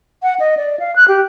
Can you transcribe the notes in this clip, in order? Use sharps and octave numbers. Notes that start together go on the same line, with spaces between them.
F#5
D#5
D5
F5
F#6
G4